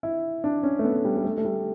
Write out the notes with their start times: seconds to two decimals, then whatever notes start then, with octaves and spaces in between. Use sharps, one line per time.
0.03 E4
0.44 D4
0.63 C#4
0.79 A3
0.84 B3
1.04 G3
1.17 G3
1.24 A3
1.37 A3
1.45 G3